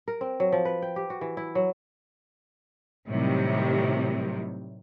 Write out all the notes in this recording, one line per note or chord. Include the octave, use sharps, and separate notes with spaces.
A#4
C4
F#3
F3
B4
G5
G4
F#4
E3
E4
F#3
A2 C3 D#3 F#3 G3